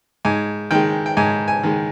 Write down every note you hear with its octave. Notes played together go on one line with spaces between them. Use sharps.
G#2 G#5
D#3 G#3 G5
G5
G#2 G#5
G#5
D#3 G#3